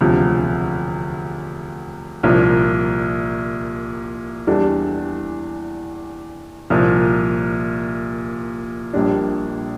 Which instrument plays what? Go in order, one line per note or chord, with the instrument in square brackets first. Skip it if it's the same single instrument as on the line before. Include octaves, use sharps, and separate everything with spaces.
[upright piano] E1 D2 C3 F3
C2 A#2 F3
E2 E3 G3 D4 A4
C2 A#2 F3
A#1 A#2 G3 D4